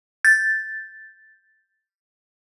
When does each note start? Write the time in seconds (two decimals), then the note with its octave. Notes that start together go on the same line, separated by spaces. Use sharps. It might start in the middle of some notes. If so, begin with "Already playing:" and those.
0.25 G6 A6